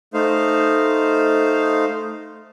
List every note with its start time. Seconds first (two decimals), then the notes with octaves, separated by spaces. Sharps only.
0.14 A3 D#4 C5 F5